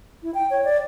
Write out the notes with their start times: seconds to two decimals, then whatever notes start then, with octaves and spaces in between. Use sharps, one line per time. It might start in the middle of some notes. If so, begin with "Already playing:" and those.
0.23 E4
0.34 G5
0.50 C#5
0.64 D5